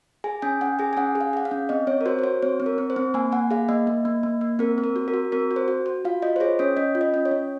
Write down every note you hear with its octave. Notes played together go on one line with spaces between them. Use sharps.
G#4 G#5
C#4 G#5
C#4 F#5
G#4 G#5
G#5
C#4 F#5
G#4
F5
G#4 F#5
F5
C#4
C4 D#5
C4 C#5
A#4
F#4 C5
C5
F#4 C#5
C4 C#5
C4
A#4
C4
C5
C4
A#3 G#5
A#3 F#5
G#4 F5
A#3 D#5
A#3
A#3
A#3
A#3
C4 A#4
C4
A#4
F#4
A#4
F#4
C4 A#4
F#4
C5
F#4
F#4
F4 F5
F4 D#5
C5
G#4 C#5
C#4 C#5
C#4 D#5
F4
D#5
C#4
C#5
C#4